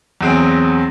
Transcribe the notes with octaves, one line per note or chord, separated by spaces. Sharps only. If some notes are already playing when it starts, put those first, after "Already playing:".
E2 F#3 C4 G#4 D7